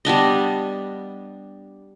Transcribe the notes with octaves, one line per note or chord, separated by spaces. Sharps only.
G3 B3 D4 D#5